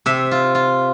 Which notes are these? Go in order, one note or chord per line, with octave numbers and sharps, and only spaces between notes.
C3 E5
F4
F4